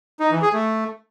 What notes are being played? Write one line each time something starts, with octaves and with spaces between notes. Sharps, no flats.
D#4
E3
G#4
A3